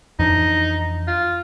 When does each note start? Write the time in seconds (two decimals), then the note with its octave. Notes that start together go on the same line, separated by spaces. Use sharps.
0.19 F2 E3 D4 D#4
1.07 F4